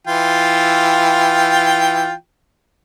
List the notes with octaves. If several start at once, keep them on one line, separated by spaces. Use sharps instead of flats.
E3 F4 G5